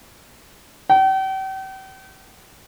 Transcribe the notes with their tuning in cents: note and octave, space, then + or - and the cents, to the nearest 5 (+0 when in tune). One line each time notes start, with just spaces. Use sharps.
G5 -40